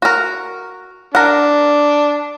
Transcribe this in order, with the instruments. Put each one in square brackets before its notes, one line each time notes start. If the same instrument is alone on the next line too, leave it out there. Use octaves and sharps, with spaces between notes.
[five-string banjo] F#4 A#4
[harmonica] D4 [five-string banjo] A#4 F#5